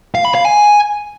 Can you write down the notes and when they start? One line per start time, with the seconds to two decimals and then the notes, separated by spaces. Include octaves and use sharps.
0.15 F5
0.25 B5
0.35 F5
0.45 G#5